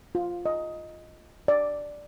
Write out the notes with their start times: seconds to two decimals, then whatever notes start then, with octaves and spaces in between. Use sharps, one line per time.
0.15 F4
0.46 D#5
1.48 D5